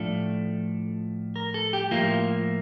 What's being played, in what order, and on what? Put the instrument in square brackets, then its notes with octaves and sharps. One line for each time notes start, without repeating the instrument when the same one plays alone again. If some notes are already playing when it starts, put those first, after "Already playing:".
Already playing: [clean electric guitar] A2 F3 A3 D4 A4
A#4
A4
G4
A2 F3 A#3 E4 F4